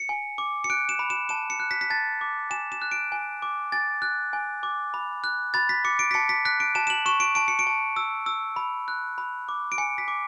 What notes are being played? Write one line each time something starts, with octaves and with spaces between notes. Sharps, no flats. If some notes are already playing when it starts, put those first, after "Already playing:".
Already playing: C#7
G#5
D6
C#7
F#6 D7
E7
B5
E7
A5 E7
C#7
F#6
B6
B6
A5 A6
D6
G#5 E7
E7
F#6
D7
G#5
D6
G#5 A6
F#6
G#5
D6
B5
F#6
B5 A6
B6
D6 C#7
D7
B6
A5 C#7
B6
F#6 B6
D7
A5 E7
E7
F#7
C#6 E7
D7
A5 D7
C#7
D7
A5
E6
E6
B5
F#6
B5
D6
D7
G#5 C#7
B6
D6